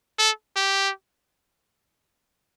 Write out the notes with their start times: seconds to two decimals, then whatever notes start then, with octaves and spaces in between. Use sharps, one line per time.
0.19 A4
0.56 G4